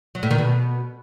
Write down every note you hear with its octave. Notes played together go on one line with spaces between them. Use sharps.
F#3
A2
D#3
B2